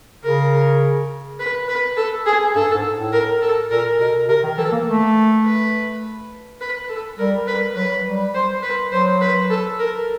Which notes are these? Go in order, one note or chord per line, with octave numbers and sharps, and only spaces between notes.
C#3 A#4
B4
B4
A4
G#4
G2 A4
G#2
A2
A#4
A4
A#2 A#4
B2 A#4
C3 A#4
D#3
E3 A4
A#3
A3
B4
B4
A4
G3 A#4
B4
F#3 B4
G3
C5
B4
F#3 C5
B4
A4
A#4